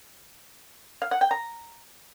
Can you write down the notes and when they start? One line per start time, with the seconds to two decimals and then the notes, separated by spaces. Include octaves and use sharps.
1.02 F5
1.11 F#5
1.21 G5
1.31 A#5